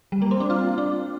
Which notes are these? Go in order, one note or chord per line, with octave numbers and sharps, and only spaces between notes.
G3
A#3
C4
D4
F4
D4